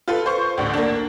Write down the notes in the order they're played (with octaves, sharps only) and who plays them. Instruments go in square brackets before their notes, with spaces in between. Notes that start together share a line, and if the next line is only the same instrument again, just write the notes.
[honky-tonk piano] F4 A4 B4
C5 C#6
A1 D2
A#3 D4